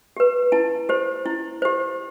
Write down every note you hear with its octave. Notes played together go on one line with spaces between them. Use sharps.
G4 B4
E4 A5
G4 C5
E4
G4 C5